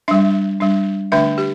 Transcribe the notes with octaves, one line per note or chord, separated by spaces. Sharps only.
G3 D4 E5
G3 D4
D3 A3 D4 E5
G4